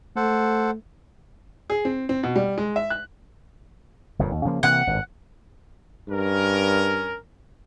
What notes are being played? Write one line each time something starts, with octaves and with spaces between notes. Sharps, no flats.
A3 A4 C5 F#5
G#4
C4
C4
B2
G3
G#3
E5
F#6
G1 F2 A#2
D#2
C#3 F3 A#3
C3 E3 A#3 F#5
G#1 G2
G2 C#4 A#4